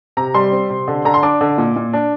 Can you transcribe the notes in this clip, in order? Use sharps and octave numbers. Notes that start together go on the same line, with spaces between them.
C3 A#5
G3 C6
C4
C3
D3
D3 A#5
C6
D4 D6
D3
A#2
A#2
D4